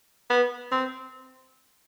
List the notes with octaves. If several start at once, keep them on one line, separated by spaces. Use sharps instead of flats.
B3
C4